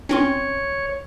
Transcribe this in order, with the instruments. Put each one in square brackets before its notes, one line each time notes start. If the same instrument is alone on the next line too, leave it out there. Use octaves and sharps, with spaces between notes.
[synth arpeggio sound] C4 C#4 C6 [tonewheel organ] C#5